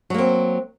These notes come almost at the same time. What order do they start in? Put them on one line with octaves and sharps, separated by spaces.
F#3 A#3 C4